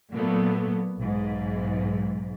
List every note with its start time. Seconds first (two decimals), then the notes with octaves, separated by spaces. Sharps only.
0.14 A#2 F#3 A3 B3
0.99 B1 G#2